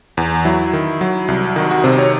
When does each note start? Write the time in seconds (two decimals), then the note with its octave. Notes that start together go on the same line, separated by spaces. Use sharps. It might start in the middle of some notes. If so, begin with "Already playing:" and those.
0.17 E2
0.45 F#3 E4
0.73 D#3
1.01 F#3
1.28 C2
1.56 D#3 F#4
1.71 F#4
1.84 C3 C5
1.99 C#5